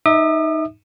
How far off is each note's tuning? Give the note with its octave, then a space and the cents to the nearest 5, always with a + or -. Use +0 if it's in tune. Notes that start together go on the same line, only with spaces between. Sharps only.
D#4 +0 E5 -25 D#6 -45